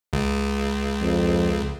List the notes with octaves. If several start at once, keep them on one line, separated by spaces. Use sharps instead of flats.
C#2
F2